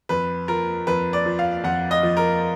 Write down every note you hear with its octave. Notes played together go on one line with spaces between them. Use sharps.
F2 B4
F3 A#4
F2 B4
D5
F3
F5
F2 F#5
D#5
F3
A#4